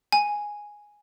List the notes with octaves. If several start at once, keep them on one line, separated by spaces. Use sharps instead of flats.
G#5